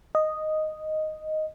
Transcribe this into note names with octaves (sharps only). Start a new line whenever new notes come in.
D#5